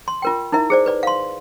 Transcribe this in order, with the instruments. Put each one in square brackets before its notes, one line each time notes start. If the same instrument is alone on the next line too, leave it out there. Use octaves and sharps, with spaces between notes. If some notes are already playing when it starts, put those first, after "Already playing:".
[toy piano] C6
F4 A#4 G5
D#4 E4 A#4 E5
G#4 C5 D5
B4 D5
F5 C6